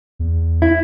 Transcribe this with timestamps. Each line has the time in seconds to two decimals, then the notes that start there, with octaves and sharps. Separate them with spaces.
0.19 E2
0.62 E4